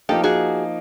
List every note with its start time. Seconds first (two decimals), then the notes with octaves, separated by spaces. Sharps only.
0.09 F3 A#3 D#4 G4 A4
0.24 F#4 G#4